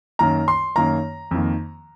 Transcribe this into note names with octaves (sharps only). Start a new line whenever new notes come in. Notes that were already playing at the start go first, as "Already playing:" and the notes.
F#2 D#3 A#3 A#5
C6
F#2 D#3 A#3 A#5
F2 D#3 A#3